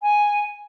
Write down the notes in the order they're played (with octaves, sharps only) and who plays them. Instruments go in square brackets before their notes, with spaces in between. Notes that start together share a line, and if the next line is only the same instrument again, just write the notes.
[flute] G#5